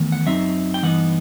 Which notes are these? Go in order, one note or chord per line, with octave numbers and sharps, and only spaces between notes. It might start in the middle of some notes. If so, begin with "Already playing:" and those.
Already playing: E2 D#3 A3
F#5
F#2 F#3 C4 D#4 E5
G5
G2 E3 B3 D#4 F#5